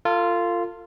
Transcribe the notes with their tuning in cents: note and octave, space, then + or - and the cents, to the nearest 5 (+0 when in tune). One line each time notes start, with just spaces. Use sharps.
F4 -10 A4 +40